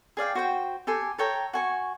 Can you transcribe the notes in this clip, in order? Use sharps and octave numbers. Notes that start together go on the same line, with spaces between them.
G#4 D5 F5 G5
F#4 C5 G5
G4 A4 G#5 C6
A4 C#5 G5 A#5
F#4 G#5 C#6